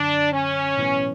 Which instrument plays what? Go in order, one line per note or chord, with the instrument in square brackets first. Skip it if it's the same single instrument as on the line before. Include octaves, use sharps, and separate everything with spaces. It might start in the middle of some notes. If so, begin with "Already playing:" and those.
Already playing: [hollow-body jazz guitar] F#2 D3 [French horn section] D4
[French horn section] C#4
[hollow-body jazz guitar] B1 A2 E3 B3